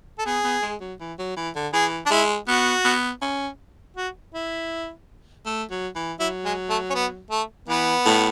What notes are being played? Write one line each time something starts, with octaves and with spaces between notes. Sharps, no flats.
A4
B3 G#4
B3
G#3
F#3
E3
F#3
E3
D3
E3 G#4
D4
G#3 E4
B3 F#4
B3
C#4
F#4
E4
A3
F#3
E3
F#3 E4
G#3
A3
C#4
B3
A3
E3 B3
A2